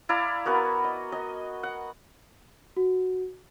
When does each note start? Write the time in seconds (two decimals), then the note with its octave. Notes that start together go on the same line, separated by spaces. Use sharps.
0.09 E4 D5 F5 A#5
0.45 B3 F#4 A#4 G#5
0.84 D#5
1.12 D#5 G#5
1.63 F#5
2.77 F#4